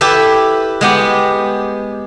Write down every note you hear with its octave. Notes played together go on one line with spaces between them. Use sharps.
E4 G4 A4 B4 E5
G#3 B3 G4